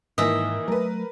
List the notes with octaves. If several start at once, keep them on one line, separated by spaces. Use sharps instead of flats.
G#2 D#3 E3 A#3 D#5 E5
F#3 A3 A#4 B4